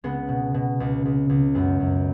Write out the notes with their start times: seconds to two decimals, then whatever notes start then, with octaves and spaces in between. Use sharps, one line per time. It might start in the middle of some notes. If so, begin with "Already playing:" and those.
0.04 C#2 G#3 B3
0.29 B2
0.54 B2
0.80 C#2
1.05 C#2
1.30 C#2
1.55 F#2 G#3 B3
1.80 F#2